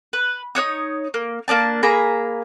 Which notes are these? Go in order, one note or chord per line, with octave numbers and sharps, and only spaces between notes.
B4
D#4 F#4 C#5 D#6
A#3
A#3 C4 D4 A5
A#3 G#4 A#5 B5